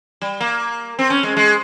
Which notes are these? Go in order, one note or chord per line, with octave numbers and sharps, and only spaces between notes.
G3
A#3
C4
C#4
G#3
G#3